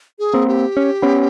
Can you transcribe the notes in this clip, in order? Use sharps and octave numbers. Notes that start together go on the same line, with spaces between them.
G#4
A#3 C4
G4
C#4
B3 C#4